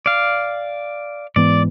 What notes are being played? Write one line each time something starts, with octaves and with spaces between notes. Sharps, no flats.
D5 F5
G#2 E3 B3 D5